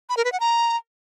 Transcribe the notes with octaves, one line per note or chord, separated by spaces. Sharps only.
B5
A#4
B4
F#5
A#5